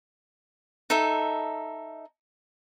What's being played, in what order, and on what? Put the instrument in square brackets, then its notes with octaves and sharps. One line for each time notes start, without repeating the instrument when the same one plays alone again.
[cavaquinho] D#4 A4 E5